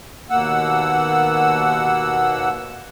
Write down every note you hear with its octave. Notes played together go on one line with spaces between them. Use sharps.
D#2 B2 A#3 F#5 E6